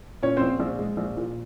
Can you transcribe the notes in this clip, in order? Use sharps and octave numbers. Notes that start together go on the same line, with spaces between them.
A#2 C#4 C#5
A#1 C4 C5
A#1
G#3
A#1
A#2